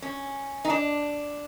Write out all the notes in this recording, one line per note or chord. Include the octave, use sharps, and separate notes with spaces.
C#4
D#4
D4